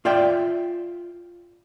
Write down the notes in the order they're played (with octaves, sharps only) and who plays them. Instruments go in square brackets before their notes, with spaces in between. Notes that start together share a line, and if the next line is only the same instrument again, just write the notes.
[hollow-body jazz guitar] F4 D5 E5 G5